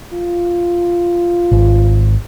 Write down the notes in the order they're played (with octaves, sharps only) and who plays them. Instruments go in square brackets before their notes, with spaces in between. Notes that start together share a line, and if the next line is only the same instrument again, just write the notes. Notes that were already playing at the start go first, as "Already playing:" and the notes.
[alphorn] F4
[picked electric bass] G#1